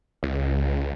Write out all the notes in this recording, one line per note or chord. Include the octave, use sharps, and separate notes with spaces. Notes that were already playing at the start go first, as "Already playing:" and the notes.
C#2